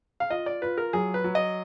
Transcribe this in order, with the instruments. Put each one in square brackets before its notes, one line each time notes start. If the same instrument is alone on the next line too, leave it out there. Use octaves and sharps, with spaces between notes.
[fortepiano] F5
[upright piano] F4 [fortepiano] D#5
[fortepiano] D5
[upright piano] F4 [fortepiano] B4
[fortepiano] A#4
[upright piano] F#3 [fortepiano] G#4
[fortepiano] B4
[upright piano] F#3
[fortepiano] D#5